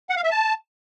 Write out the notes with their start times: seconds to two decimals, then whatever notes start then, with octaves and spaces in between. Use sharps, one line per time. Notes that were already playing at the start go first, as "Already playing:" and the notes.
0.10 F#5
0.17 F5
0.24 E5
0.31 A5